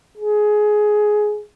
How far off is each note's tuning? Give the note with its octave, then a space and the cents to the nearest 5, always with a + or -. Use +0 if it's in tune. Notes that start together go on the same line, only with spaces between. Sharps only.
G#4 +15